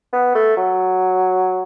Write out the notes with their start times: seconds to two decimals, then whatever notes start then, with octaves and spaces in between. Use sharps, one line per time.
0.13 B3
0.35 A3
0.57 F#3